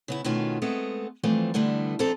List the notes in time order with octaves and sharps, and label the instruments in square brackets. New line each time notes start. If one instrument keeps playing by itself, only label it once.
[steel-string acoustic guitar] C#3 B3 E4
B2 D#3 A3 C#4 F4 F#4
G#3 A3 B3 C4
E3 F3 G3 A3 C4
D3 E3 G3 A3 B3 D4
F2 C4 D4 F4 A4 A#5